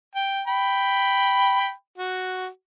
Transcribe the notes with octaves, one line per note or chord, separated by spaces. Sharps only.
G5
G5 B5
F#4